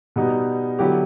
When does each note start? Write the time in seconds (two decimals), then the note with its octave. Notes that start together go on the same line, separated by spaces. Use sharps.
0.16 B2 G3 B3 D#4
0.79 D3 F#3 B3 E4 G4